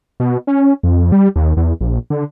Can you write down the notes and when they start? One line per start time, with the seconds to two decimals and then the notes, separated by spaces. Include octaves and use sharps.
0.20 B2
0.47 C#4
0.83 F2
1.12 G3
1.36 D#2
1.57 E2
1.81 A#1
2.10 D3